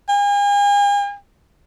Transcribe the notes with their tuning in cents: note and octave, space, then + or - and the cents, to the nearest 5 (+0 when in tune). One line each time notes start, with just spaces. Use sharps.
G#5 -45